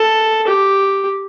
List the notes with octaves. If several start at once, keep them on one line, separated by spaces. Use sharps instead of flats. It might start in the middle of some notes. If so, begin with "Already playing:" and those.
Already playing: A4
G4